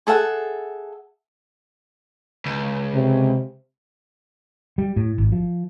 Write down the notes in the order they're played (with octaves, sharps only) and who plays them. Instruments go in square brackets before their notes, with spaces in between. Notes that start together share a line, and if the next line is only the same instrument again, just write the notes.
[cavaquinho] G#4 A4 E5 F#5
[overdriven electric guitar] C#2
[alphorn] C3
[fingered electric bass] G3
A2
G#1
F3